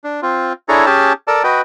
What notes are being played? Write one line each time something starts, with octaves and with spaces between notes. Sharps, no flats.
D4
C4 F4
D4 E4 G#4 A4 C#5 A#5
C#4 G4 G#4 A5
A4 A#4 D5 A5
F#4 B4 D#5 G5